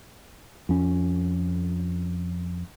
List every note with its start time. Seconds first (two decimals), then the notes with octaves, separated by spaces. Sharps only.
0.69 F2 C#4